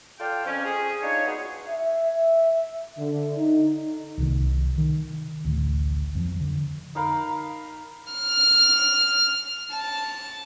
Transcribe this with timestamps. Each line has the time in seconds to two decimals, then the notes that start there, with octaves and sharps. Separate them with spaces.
0.20 F4 A4 D5 F5 G5
0.46 F2 C#4
0.65 G#4
1.02 D4 D#4 F4 C#5
1.25 B3 D#4 F#4 G#4
1.68 E5
2.98 D3
3.37 D#4
4.18 C2 C3 D#3
4.78 D#3
5.45 A1 D2
6.15 F2 E3 F3
6.41 D3
6.95 D#4 A#4 F5 B5
8.13 F6
9.73 A5